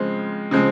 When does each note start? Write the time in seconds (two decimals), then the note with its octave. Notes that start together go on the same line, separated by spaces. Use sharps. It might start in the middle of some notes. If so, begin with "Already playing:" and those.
Already playing: C#3 F3 G#3 C4
0.51 C#3 F3 G#3 C4